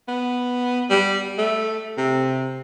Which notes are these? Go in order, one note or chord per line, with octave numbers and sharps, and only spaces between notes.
B3
G3
A3
C3